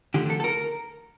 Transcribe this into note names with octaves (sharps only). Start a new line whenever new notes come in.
D#2 D3 F3 A3 G4
A4
A4
A#4